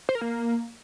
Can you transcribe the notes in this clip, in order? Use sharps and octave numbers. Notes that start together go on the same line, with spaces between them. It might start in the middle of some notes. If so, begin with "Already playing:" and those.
C5
A#4
A#3